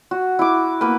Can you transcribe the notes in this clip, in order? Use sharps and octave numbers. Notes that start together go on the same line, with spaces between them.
F#4
E4 D6
A#3 B3 B4 E5